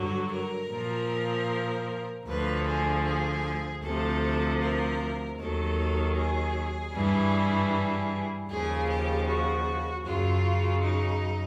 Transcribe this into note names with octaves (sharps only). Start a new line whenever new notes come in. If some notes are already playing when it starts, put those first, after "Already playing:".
Already playing: G2 D3 F#3 F#4
A#4
A#2 F3
D2 D3 F3 B4
G#4
G#4
D2 C3 F3 A4
A#4
D#2 D#3 F#3 A4
G#4
G2 E3 G3
D#2 C#3 F3 G#4
G4
F#4
F#2 C#3 F#3 F4
D#4